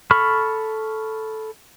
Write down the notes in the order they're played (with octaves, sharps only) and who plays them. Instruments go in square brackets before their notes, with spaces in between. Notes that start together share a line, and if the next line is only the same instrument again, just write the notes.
[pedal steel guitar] A4 B5 C#6 F6